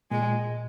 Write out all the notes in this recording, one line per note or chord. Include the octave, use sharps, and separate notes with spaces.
A#2 G#3